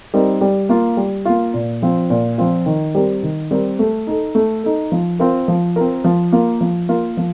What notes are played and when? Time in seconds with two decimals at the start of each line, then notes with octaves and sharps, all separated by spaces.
0.14 G3 C4 D#4 A#4
0.41 G3
0.69 A#3 F4
0.97 G3
1.25 A#3 F4
1.54 A#2
1.82 F3 C4 F4
2.10 A#2
2.38 F3 C4 F4
2.66 D#3
2.95 G3 C4 G4 A#4
3.23 D#3
3.51 G3 C4 G4 A#4
3.79 A3
4.07 D#4 A4
4.35 A3
4.64 D#4 A4
4.92 F3
5.19 C4 F4 A#4
5.48 F3
5.76 C4 F4 A#4
6.04 F3
6.32 A#3 F4 A#4
6.61 F3
6.89 A#3 F4 A#4
7.17 F3